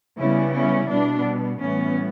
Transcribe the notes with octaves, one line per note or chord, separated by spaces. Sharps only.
C#3 G3 B3 C#4 E4
C#4 E4
B2 G3 B3 D4
A2 E3 G3 B3 C#4